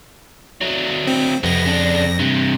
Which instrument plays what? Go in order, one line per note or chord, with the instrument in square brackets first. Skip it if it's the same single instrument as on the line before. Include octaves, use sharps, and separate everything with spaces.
[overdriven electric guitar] F#3 A3
[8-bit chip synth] C4
[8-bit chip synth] F2 A#6 [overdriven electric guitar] C3 B3
[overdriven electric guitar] C#3 D4
G2 C3